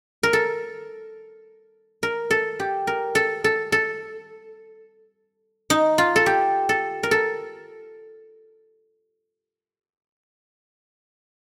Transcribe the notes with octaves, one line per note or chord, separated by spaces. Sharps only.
A#4
A4
A#4
A4
G4
A#4
A4
A4
A4
D#4
F4
A4
G4
A4
A#4
A4